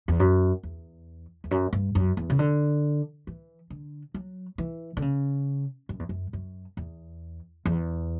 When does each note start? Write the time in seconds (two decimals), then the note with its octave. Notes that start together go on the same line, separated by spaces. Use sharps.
0.08 E2
0.20 F#2
0.63 E2
1.44 E2
1.51 F#2
1.73 G2
1.95 F#2
2.17 E2
2.30 C#3
2.39 D3
3.27 E3
3.70 D3
4.14 F#3
4.58 E3
4.97 D3
5.02 C#3
5.89 F#2
5.99 E2
6.09 F#2
6.33 F#2
6.77 E2
7.66 E2